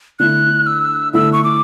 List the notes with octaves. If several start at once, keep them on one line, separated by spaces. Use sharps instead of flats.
D3 A3 E4 F#6
E6
D3 A3 E4 E6
C#6
D6